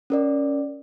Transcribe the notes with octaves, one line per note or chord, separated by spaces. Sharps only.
C#4 A#4 D5